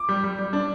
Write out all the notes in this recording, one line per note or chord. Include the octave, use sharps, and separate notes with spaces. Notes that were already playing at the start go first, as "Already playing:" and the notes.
Already playing: D6
G3
G3
G3
D4